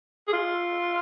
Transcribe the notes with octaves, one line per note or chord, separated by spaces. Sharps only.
G#4
F4